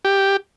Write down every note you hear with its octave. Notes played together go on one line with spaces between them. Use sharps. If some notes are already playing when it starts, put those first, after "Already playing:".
G4